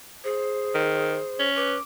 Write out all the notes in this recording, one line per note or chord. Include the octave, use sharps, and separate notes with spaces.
G#4 C5
D#3
C#4
B4 D6